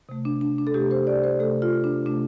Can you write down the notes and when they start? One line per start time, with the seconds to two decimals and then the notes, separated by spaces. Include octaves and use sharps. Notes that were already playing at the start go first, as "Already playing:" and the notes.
0.09 C3 A3
0.25 D4
0.41 D4
0.58 D4
0.67 A4
0.74 C3 A3 G4
0.91 C5
1.07 D5
1.24 C5
1.40 C3 A3 A4
1.62 F4
1.84 D4
2.06 C3 A3 D4